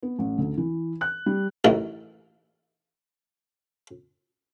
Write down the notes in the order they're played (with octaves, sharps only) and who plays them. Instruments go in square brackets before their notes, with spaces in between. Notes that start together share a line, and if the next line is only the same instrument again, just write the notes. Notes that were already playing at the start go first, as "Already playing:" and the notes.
[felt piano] B3
A1
D2
E3
F#6
G3
[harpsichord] A1 F#2 A2 D#3 E3